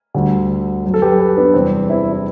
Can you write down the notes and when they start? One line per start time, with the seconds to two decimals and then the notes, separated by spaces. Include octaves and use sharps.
0.15 D2 D3 G3
0.84 F#2 F#3
0.94 A4
1.02 G4 B4
1.19 G4 B4
1.36 B3 D4
1.54 E2 C3 G3 C4
1.90 C4 E4
2.12 E4